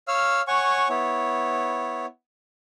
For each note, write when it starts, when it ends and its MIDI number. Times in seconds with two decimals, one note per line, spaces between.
0.08 0.41 73
0.08 0.41 77
0.08 0.41 88
0.08 0.41 89
0.48 0.88 73
0.48 0.88 78
0.48 0.88 80
0.48 0.88 85
0.89 2.06 59
0.89 2.06 64
0.89 2.06 73